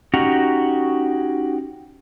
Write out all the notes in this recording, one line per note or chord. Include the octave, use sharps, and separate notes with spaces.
C#4 D#4 F#4 G4